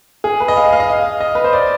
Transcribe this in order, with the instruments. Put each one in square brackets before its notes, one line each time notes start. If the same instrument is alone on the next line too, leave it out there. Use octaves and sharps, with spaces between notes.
[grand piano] G#4
B4
D#5
F5
D#5
F5
D#5
F5
D#5
B4
C5
D5